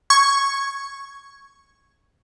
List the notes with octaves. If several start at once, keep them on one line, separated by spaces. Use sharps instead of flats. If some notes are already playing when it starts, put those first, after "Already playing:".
C#6 G#6